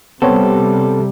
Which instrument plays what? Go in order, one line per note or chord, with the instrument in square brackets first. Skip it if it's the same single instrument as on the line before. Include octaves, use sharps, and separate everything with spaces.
[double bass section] C3 G3 [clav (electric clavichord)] B3 C4 C#5 [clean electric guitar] A4